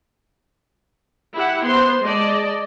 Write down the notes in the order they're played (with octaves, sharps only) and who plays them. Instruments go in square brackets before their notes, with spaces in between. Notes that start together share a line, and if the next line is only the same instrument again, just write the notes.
[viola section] E4 G4 F#5
B3 C5 C6
G#3 D5 D#5 A5